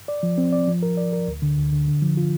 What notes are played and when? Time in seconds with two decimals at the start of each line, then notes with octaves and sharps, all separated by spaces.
0.08 D5
0.23 F3
0.38 C4
0.52 D5
0.67 F3
0.83 A#4
0.97 D5
1.13 A#4
1.28 D2
1.42 D3
1.57 D2
1.72 D3
1.87 D3
2.02 F3
2.17 F4